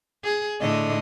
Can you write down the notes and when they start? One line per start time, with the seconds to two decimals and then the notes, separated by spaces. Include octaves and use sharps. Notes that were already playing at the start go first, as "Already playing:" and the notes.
0.24 G#4
0.61 A2 D3 D#5